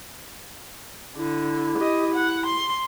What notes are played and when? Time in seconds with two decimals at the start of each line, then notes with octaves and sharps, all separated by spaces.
1.16 D3 E4
1.78 G4 D#5
2.14 F#5
2.46 C6